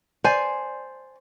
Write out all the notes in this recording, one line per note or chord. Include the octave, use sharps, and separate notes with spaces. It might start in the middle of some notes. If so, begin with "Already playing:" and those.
C5 D5 G#5